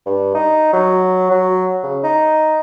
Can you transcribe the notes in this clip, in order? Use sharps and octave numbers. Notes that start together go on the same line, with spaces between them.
G2
D#4
F#3
F#3
C#3
D#4